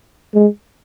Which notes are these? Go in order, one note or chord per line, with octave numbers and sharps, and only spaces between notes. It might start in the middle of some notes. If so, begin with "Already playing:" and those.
G#3